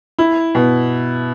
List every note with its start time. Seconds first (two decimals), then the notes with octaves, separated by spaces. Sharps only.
0.19 E4
0.55 B2